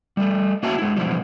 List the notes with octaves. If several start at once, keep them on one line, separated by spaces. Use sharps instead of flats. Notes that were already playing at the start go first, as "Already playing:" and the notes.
G3 A3
A#3 F#4 C#5 E5 G#5 A5
G#3 E4
B2 E3 F3 G3